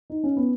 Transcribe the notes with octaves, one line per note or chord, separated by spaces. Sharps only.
D#4
C#4
B3